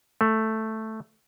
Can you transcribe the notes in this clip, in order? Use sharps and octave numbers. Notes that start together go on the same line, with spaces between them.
A3